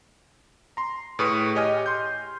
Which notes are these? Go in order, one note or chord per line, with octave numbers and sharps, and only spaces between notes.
A#5 C6
A2 G#4 B4 C#6 D#6 C#7
G4 C#5 D#5 G#5 F6 D#7
C6 G6